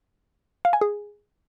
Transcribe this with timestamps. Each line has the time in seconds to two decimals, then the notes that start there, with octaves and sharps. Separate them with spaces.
0.65 F5
0.73 G#5
0.81 G#4